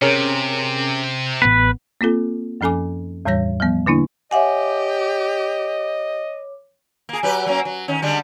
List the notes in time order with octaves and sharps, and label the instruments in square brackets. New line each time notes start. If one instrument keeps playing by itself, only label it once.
[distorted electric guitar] C3 [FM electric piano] C#4 G#4 A#4
[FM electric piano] A1 B3 [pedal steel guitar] B4
[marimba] A#3 C4 F4 A4
F#2 F3 C#4 A4 G#5 D6
E2 A2 E3 G3 C#5 A#6
F3 G3 B3
D3 A#3 D4 E4
[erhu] G4 [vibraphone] C#5 D6 [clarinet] D#5 [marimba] E5 F#5 G#5
[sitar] A#3 G#4
F#3 G4 B4
F#3 A#3 C#4
F#3
D#3 C#4
D3 G3 G#3